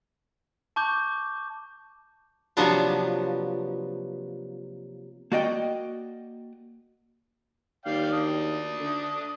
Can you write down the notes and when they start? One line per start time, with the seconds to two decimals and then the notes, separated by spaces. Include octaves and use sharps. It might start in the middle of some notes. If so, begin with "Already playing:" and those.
0.76 A5 C#6 D6 G6
2.57 C3 F3 F#3 A#3 B3 D4
5.32 A#3 F#4 D5 D#5 G5
7.85 D#2 D5 F5 G5
8.13 D4 D#6
8.80 D3